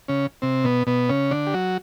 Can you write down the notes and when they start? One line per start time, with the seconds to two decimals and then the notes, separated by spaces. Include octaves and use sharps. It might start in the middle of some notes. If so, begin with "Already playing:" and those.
0.08 C#3 C#4
0.42 C3 C4
0.64 B2 B3
0.87 B2 B3
1.09 C#3 C#4
1.31 D3 D4
1.47 G4
1.54 F#3 F#4